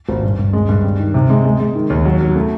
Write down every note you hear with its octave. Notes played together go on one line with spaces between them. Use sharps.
G#1
G2
G2
G#3
G2
G3
D#3
C3
G#3
G#3
G#3
D#3
D#2
F#3
F#3
A3